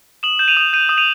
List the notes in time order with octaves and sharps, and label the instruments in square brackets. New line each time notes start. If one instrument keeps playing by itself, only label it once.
[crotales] D#6 E7 F#7
G6 E7
D#7 F7
D#6
G6 D#7 F7
D#6
D#7 F7